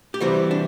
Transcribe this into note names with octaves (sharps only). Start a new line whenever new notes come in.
G4
C3 E3 G3 F#4
D4